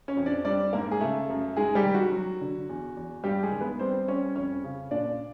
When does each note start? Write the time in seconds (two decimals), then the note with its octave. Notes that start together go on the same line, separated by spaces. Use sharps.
0.08 C#4 C#5
0.17 F2
0.26 D4 D5
0.45 G3 D4 D5
0.73 G#2 A#3 A#4
0.91 G#4
1.00 C#3 A3 A4
1.30 F#2
1.56 G#3 D#4 G#4
1.75 G3 G4
1.85 D#3
1.95 F#4
2.12 F#3
2.41 D3
2.69 E2
2.97 E2
3.24 G2 G3 G4
3.43 G#3 G#4
3.52 D#3
3.61 B3 B4
3.79 G3 C4 C5
4.08 G3 C#4 C#5
4.35 F2 C#4 C#5
4.64 C#3
4.91 A#2 D4 D5